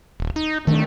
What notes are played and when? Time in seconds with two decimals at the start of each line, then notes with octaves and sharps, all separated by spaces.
0.20 D#1
0.36 D#4
0.67 D#3 A3 D4